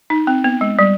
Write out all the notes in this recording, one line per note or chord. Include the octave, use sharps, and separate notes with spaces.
D#4
C4
B3
G#3
G3